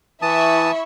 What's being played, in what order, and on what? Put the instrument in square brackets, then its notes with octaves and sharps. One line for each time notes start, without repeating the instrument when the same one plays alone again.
[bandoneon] E3 A5 D#6 [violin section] E4 E5 C#6